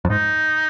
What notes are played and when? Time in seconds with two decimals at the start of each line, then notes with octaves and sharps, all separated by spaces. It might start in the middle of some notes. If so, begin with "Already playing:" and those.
0.05 F2
0.10 G#2 D#4